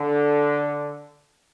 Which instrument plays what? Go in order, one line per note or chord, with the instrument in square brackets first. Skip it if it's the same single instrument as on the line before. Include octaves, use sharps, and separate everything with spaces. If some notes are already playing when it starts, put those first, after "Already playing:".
Already playing: [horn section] D3